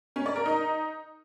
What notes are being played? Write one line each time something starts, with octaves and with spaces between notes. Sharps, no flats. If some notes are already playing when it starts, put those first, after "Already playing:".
C#4
D5
A#4
D#4